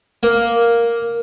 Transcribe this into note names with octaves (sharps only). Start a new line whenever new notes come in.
A#3